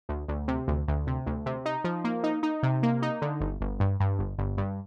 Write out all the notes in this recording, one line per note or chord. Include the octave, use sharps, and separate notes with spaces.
D2
D2
C3
D2
D2
C3
D2
C3
D#4
F3
A#3
D#4
D#4
C3
A#3
D#4
D3
G1
G1
G2
G2
G1
G1
G2